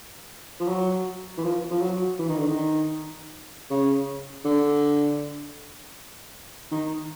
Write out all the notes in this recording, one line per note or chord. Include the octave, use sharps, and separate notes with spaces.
F3
F#3
E3
F3
F3
F#3
E3
D#3
D3
D#3
C#3
D3
D#3